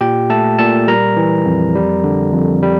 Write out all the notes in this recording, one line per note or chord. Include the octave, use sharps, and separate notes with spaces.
A#2 G4 G5
A3 A4 A5
A#2 A4 A5
G3 A#4 A#5
E3
F2
G3
D3
F2
G3